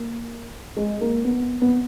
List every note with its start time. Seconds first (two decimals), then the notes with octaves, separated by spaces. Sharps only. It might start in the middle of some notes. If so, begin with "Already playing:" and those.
Already playing: A#3
0.77 G#3
1.01 A#3
1.25 B3
1.61 B3